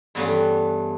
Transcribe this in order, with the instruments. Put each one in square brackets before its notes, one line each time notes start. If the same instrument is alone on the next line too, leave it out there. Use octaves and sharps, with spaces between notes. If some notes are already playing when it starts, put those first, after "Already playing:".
[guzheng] G2 E3 G3 A3 B3 C#4